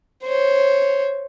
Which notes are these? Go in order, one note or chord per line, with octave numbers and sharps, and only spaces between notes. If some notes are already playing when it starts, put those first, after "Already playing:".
C5 C#5